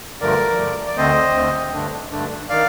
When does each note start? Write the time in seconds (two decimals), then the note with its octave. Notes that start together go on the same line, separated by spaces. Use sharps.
0.21 G2 D3 F3 A3 A#4 D5
0.59 G2 D3 F3 A3
0.87 D5
0.97 D2 D3 A3 C4 C5 D#5
1.35 D2 D3 A3 C4
1.73 G2 D3 A3 D4
2.12 G2 D3 A3 D4
2.49 D#3 D5 F5